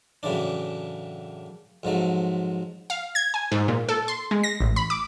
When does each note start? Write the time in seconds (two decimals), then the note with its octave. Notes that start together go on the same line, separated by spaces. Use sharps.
0.23 F#2 A2 C#3 E3 D4
1.83 F2 G#2 F#3 A3
2.90 F5
3.15 G#6
3.34 G#5
3.52 G#2
3.68 A#2
3.89 A4
4.08 C6
4.31 G#3
4.43 A#6
4.61 A1
4.76 B5
4.90 D6